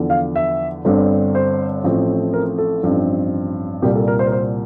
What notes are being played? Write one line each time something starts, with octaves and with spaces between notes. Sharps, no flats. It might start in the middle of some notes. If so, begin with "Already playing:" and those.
Already playing: E2 D3 F3
F5
E5
G1 G2 D3 G3 C4
C5
A1 A2 F3 A3 C4
A#4
A4
A1 G2 F3 C4
C2 A#2 G3 G4
A4
A#4
C5
A#4
C5